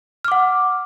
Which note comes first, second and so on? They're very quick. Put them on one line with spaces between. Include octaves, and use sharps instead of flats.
F6 D6 F#5